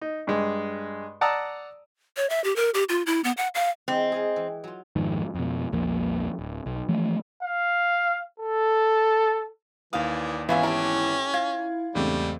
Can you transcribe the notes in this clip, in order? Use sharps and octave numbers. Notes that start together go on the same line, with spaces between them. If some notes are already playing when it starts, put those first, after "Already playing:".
D#4
G2 G#3
D5 F#5 A5 A#5 D#6 E6
C#5
E5
G4
A#4
G4
F4
E4
B3
F#5
F5
E3 G#3 C4 E4
G#4 D#5 F5
E3
F#3 F4
G#1 F2 G#2 D#3
F2 B2
A#1 E2 F3 A#3
D1
B1
E3 F3 A3
F5
A4
D#2 E3 D5 F5 D#6
G#1 E3 B3 C#4 E4 F4 G#5
E4 G4 A4 A#4
F4 G#6
E2 G#2 C#3 G3 A3 C4